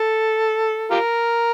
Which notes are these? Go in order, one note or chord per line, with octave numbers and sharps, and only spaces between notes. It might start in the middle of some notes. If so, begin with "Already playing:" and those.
Already playing: A4
F4 G4 A#4